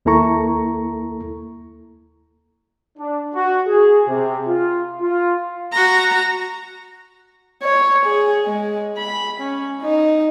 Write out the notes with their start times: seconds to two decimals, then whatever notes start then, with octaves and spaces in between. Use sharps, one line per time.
0.05 D#2 A#3 E4 A4 A#5 C#6
2.98 D4
3.35 F#4
3.67 G#4
4.08 C3
4.48 F4
5.02 F4
5.72 F#4 A#5
7.63 C#5
8.05 G#4
8.46 G#3
8.98 B5
9.41 C#4
9.81 D#4